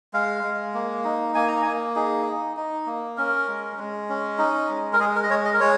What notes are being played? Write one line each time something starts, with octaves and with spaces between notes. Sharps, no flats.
G#3 F5
G#3
A#3
D#4
A#3 G#5
A#5
A#3 G#5
D#4 G#4
D#4
D#4
A#3
C#4 A#4
G#3
G#3
C#4
D#4
G#3
A#4
G#3 G#4
A#4
D#5
G#3 C#5
D#5
A#4
G#3 C#5